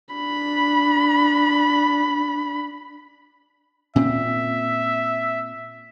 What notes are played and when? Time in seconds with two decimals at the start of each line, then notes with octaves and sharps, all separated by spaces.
0.15 D4 B5
3.96 A#2 C4 C#4 E5